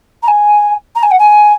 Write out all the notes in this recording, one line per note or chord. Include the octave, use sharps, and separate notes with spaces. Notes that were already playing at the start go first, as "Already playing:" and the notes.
A#5
G#5
A#5
G#5
F#5
G#5